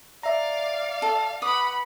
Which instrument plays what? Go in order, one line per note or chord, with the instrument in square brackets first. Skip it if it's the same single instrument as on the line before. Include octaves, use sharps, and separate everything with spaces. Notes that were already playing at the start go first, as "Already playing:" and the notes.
[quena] D5 [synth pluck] E5 A#5 [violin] F5
[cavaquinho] A4
[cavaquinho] B4 D6 D#6 [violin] F#5 B5